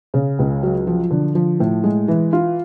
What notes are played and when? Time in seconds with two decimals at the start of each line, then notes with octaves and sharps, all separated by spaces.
0.14 C#3
0.39 C#2
0.63 F#3
0.87 F3
1.10 D3
1.35 F3
1.60 A2
1.84 G#3
2.08 E3
2.33 F4